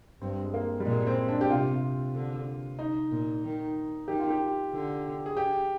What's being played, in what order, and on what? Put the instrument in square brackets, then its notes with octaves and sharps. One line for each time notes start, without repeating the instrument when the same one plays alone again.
[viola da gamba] G2 [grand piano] C4
[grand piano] G#3
A#3
G3
[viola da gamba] A#2 [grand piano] G#3
[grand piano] C4
D4
G4
[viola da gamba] C3 [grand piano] F4
[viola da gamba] D3
[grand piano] D#4
[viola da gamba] A#2
D#3
[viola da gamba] D#3 [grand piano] G4
[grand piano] F4
G4
[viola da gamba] D3
[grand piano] G#4
G4